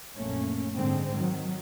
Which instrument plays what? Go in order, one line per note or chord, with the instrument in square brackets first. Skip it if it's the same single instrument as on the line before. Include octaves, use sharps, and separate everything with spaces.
[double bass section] A#1 F#2 A3 A#3 C#4
G#2 D3 G#3 C4
D#3 F#3